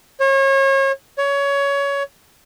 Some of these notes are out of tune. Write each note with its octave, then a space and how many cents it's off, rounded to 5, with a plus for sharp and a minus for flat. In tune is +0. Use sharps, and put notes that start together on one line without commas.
C#5 -35
C#5 +20